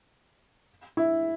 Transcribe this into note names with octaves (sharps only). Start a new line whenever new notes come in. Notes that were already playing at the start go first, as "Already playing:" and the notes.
E4